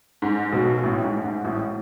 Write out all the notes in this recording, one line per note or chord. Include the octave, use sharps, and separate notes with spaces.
G#2
B1 B2
A1 A2
G#2
G#2
A1 A2